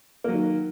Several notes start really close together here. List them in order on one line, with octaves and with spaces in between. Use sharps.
A#3 F#3 D#3